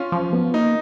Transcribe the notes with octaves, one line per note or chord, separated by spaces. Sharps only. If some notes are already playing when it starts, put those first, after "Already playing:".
Already playing: C#4 F4
F3
B3
A#3 D#4